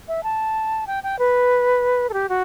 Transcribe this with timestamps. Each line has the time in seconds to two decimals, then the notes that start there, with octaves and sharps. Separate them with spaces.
0.08 E5
0.23 A5
0.87 G5
1.03 G5
1.19 B4
2.09 A4
2.14 G4
2.29 F#4